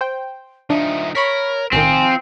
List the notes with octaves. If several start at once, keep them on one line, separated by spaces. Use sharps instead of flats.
C5 G5
F3 D4 D#4 E5
A#4 C#5 B5 C#6 B6
B1 A2 D#3 C4 F4 C5 G#5